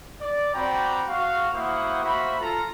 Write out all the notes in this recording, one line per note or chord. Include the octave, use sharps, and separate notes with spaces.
D5
C4 F#4 D5 G5 A#5 B5
F#4 F5
A#3 E4 F#4 C5 F#5 D#6
A#3 F#4 C5 E5 B5
F4 A4 A#5